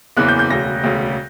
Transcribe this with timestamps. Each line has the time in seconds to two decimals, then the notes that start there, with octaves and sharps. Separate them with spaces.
0.17 F#1 E2 C#3 E3 F#6
0.28 G6
0.39 G6
0.50 E1 D2 C#3 A#6
0.83 E1 D2 C#3